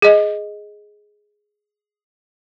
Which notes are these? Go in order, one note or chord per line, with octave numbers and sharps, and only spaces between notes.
G#4 D#5